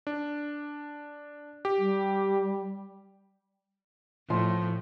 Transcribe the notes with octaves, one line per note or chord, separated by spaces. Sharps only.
D4
G4
G3
A2 F3